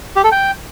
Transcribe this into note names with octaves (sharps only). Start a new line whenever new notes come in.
G4
A4
G5